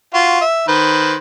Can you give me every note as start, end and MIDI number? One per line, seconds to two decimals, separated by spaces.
0.14 0.41 65
0.14 0.41 66
0.41 0.68 76
0.68 1.16 51
0.68 1.16 71
0.68 1.16 72